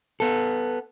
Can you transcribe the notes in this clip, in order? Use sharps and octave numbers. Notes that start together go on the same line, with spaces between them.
B3 A4